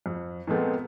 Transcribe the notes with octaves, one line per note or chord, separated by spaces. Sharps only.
F2
A#2 F3 G#3 A3 B3 C4